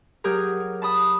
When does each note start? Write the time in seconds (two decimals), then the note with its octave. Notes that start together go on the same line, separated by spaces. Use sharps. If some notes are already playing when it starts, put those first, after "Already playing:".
0.24 F#3 G4 G#4 A#4
0.82 A5 B5 D#6